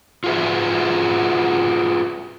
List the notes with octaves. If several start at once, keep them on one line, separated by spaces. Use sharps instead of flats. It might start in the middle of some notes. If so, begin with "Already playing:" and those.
F4 F#4 G#4 B4 E5